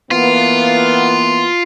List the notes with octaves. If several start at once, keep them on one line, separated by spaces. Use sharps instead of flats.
E3 A#3 B3 F4